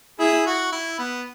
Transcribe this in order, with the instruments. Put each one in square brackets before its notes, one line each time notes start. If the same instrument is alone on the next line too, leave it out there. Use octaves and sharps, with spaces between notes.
[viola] E4 [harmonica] G#4
[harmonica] F#4
E4
B3